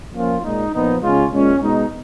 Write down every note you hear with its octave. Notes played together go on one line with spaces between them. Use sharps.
F3 A#3 C#4 F4
A#2 G#3 D#4
A#2 F3 B3 D#4
C#3 G#3 C#4 F4
A#2 G#3 C#4 F4
B2 G#3 D#4